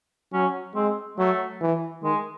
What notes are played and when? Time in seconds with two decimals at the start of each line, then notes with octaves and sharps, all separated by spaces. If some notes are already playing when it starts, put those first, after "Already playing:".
0.33 F#3 C#4
0.75 G#3 C4
1.18 F#3 A3
1.61 E3
2.03 D#3 G#3